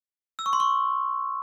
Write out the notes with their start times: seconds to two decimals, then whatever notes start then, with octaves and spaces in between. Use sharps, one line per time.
0.39 E6
0.46 C#6
0.53 C6
0.60 C#6